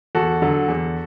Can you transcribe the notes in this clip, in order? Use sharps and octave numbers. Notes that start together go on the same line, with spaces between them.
E2 F#4 A4
D3 F#3
E2